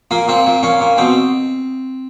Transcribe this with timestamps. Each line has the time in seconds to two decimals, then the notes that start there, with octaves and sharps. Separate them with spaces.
0.11 A#2 A#3
0.28 A#2 C4
0.46 A#2
0.63 A#2 C#4
0.81 A#2
0.98 B2 C4